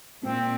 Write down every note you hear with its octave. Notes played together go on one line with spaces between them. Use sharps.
A#2 C4